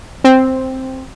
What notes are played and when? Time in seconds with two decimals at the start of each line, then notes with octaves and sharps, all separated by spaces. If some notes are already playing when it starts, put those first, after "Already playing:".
0.24 C4